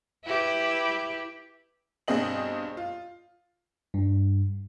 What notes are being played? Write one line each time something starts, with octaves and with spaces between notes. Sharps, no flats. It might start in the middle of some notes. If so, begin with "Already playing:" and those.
E4 G4 B4
G2 B2 C4 G#4 D#5 F#7
F4
G2